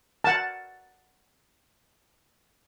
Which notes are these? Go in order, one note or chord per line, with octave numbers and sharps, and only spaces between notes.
F#5 A5